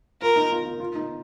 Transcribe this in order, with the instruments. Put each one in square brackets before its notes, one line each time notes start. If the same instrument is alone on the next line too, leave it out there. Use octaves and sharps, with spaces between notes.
[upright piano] F4 [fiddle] A#4
[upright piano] D#4
F4
F4
F4
D#4